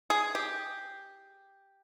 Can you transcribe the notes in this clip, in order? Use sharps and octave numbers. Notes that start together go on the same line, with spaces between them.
G#4
G4